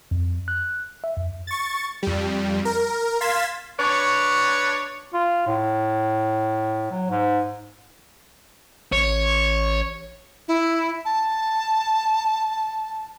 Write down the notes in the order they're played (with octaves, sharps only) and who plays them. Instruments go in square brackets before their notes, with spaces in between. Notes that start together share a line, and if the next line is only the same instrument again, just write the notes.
[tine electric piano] F2
F#6
E5
F2
[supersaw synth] C#6 A6
F2 G3
A#4
F5 C6 G#6 A6 B6 E7
[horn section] D4 B4 C#5
[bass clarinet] F4
A2
F#3
G#2
[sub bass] A1 [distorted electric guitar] C#5
[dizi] E4
A5